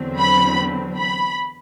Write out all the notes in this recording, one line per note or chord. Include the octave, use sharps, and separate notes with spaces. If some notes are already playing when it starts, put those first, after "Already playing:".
Already playing: E2 D3 F#3 C4
B5
B5